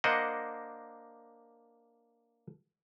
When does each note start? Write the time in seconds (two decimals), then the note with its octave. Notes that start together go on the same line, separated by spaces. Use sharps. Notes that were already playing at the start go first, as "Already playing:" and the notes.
0.04 A#3 D4 C5 D#5 F#5